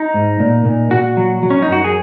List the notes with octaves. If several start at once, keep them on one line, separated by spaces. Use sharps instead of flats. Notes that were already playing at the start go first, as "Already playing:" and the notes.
Already playing: D#4
G#2
A#2
A#2
A#2 F#4
F#3
F#3
C#4
D#4
F#2 F#4
G#4